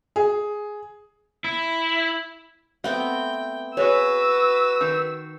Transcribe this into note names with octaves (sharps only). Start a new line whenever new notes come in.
G#4
E4
A3 B3 C4 F#5 G5
F#4 G#4 B4 C#5 E6
D#3